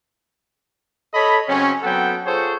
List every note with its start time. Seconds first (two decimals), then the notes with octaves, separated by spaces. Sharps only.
1.14 A4 C#5 D#5 B5
1.48 C#3 F#3 C4 C#4
1.83 F#3 B3 C4 A4 F#5 G5
2.26 F4 G#4 A4 C5 C#5